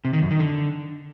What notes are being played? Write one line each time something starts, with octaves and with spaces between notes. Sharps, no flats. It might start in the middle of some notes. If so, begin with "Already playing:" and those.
C3
D#3
F#2
D#3
D3